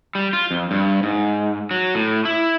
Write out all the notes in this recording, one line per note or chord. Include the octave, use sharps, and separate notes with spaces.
G3
F4
F2
G2
G#2
F#3
A2
E4